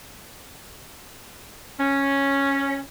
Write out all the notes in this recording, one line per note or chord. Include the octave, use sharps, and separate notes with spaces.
C#4